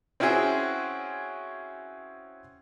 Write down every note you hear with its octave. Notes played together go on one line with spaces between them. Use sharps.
C4 C#4 E4 F#4 G#4 C5